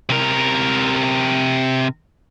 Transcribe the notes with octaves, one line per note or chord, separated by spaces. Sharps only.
C3 A#4